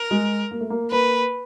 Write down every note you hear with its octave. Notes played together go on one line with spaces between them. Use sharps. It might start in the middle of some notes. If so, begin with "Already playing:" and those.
Already playing: A#4
G#3
A#3
A3
A#3
A#3 B4